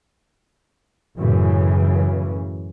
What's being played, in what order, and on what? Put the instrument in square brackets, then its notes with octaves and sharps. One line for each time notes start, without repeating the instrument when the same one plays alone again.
[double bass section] F#2 A2 C#3 E3